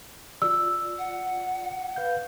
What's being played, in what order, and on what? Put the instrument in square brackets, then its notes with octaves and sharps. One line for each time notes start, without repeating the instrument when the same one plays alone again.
[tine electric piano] F4 D5 [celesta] E6
[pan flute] F#5
[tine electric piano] B4 F5 G6